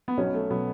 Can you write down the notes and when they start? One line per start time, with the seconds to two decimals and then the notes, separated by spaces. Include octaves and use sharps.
0.08 B3
0.17 B1 B2 F#3 C#4
0.34 A3
0.50 B2 F#3 B3